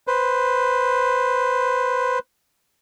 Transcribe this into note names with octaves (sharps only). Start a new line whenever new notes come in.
B4 C5